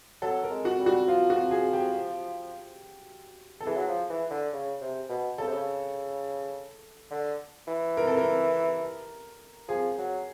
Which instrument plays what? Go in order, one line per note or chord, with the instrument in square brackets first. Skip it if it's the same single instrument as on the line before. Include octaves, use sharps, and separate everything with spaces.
[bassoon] F#3 [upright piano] A4
[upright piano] A#4
[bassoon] G#3
[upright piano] F#4
[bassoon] G3
[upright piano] F#4
[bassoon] F3 [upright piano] F4
[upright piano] F#4
G#4
G4
A4
[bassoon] E3 [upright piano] G#4
[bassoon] F#3
F3
E3
D3
C#3
C3
B2
[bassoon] C#3 [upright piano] A4
[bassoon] C3
C#3
D3
E3
[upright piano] A#4
A4
A#4
[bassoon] F3 [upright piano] G#4
[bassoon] F#3